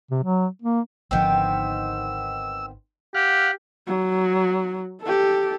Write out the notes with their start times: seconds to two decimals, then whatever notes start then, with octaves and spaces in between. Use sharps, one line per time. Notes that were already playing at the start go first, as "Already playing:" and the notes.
0.11 C3
0.23 F#3
0.62 A#3
1.11 G#1 D3 D#3 F3 B3 C4 E6
3.15 G4 F5 F#5
3.87 F#3
5.02 G4 A4